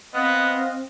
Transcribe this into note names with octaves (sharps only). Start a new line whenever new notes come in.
B3 C4 D#5 F5 F#6